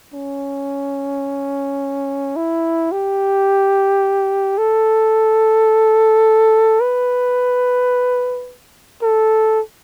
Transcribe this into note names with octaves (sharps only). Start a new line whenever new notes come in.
C#4
E4
G4
A4
B4
A4